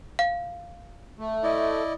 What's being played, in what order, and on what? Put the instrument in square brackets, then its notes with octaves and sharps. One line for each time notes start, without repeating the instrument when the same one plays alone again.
[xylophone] F5
[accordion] A3
[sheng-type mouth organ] E4 D5 D#5